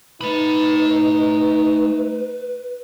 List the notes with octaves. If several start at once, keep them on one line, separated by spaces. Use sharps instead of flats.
A3 D#4 B4 B5